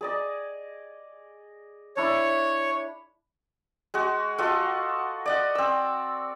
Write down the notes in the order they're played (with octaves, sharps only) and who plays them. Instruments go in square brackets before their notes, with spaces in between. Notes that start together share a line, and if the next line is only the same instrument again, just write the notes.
[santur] G#4 D5 D#5
[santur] D4 E4 [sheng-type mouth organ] C#5
[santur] G#3 F#4
F4 F#4 A4 D#5
D5 D#5 F#5
C4 E6